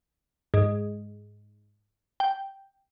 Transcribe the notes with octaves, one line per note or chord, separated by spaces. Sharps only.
G#2
G5